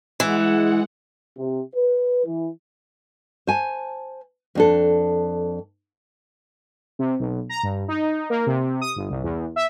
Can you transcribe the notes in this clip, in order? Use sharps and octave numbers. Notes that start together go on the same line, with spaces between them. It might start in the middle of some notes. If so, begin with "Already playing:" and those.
E3 G#3 F#5
C3
B4
E3
C5 G#5 A5
F2 D4 A4
C3
B1
A#5
G2
D#4
A#3
C3
D#6
G1
C2
E2
E5